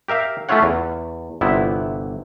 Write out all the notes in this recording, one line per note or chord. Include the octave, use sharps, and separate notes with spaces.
G4 A#4 E5 F5
A3 C#4 E4 F4 C#5 F#5
E2
G1 C3 B3 E4